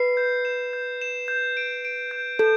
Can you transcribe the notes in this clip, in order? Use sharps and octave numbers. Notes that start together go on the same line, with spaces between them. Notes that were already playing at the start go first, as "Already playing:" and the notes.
Already playing: B4 C7
G6
E7
G6
E7
G6
D7
D7
G6
A4 G6